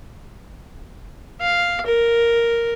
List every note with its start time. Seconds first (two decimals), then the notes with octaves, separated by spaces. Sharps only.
1.41 F5
1.86 A#4